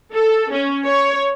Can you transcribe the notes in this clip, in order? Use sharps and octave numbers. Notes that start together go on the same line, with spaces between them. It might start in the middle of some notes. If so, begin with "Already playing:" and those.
A4
C#4
C#5